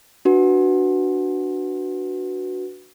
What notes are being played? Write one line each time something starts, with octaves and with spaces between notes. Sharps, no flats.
D4 F#4 B4